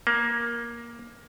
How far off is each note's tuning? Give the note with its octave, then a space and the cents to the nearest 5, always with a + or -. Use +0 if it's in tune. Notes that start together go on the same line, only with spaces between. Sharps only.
A#3 +15